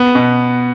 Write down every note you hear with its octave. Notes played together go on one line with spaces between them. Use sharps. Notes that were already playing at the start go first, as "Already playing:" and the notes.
Already playing: B3
B2